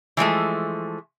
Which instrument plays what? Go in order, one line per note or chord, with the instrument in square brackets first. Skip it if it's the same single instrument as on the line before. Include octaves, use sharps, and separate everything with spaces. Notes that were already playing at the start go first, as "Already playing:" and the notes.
[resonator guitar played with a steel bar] E3 F3 G#3 A3